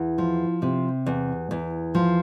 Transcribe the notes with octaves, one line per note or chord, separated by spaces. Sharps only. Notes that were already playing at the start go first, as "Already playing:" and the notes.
Already playing: E2
F3
C3
E2
E2
F3